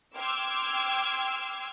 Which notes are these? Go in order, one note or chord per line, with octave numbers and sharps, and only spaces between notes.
G5 C6 D6 E6 F6 G#6